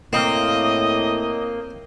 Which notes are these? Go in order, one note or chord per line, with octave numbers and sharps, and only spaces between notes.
A2 A#3 C4 D#5